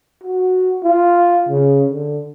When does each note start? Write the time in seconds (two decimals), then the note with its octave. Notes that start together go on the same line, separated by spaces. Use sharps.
0.23 F#4
0.84 F4
1.49 C#3
1.90 D3